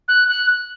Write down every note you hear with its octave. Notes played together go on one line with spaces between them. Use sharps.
F#6
F#6